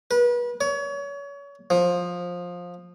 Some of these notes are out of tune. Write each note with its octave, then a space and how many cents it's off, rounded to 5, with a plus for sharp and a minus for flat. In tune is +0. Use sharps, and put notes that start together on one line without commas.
B4 -35
C#5 +30
F3 +15